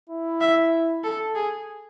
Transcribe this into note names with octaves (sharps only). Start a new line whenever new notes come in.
E4
E5
A4
G#4